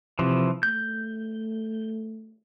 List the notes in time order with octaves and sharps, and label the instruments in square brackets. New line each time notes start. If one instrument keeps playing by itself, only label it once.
[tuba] C3 [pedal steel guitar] E3 F3
[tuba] A3 [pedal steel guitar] G6